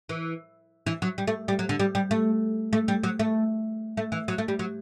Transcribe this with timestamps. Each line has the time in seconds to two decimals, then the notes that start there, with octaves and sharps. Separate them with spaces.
0.09 E3
0.86 E3
1.02 F#3
1.18 G3
1.27 A3
1.48 G3
1.59 F#3
1.69 D3
1.80 G3
1.95 G3
2.11 A3
2.73 A3
2.88 G3
3.03 F#3
3.19 A3
3.97 A3
4.12 E3
4.28 F#3
4.38 A3
4.48 G3
4.59 F#3